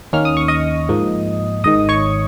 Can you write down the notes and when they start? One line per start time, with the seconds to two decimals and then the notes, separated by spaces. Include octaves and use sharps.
0.13 D#2 D#3 A#3 C#4 F6
0.25 D#6
0.37 C#6
0.48 D#5 D#6
0.89 G#2 F3 A#3
1.64 G#1 G#2 D#3 D#5 D#6
1.89 C#5 C#6